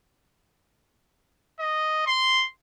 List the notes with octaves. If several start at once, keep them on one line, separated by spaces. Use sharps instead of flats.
D#5
C6